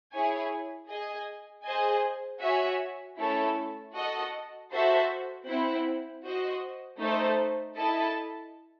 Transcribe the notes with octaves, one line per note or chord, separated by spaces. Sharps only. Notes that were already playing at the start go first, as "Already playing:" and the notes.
E4 G#4 C#5 G#5
G#4 D#5 G#5
G#4 C5 D#5 G#5
F#4 C#5 E5 G#5
A3 C#4 E4 A4 C#5
F#4 A4 D#5 F#5
F#4 A4 C5 E5
C4 E4 C5 F#5
F#4 C5 D#5
A3 D#4 A4 C5
E4 A4 D#5 A5